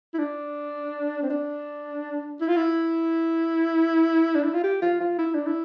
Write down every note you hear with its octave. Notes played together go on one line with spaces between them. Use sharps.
E4
D4
C4
D4
E4
F4
E4
D4
E4
F4
G4
F4
F4
E4
D4
E4